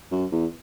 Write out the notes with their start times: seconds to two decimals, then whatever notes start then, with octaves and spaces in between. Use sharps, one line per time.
0.12 F#2
0.32 E2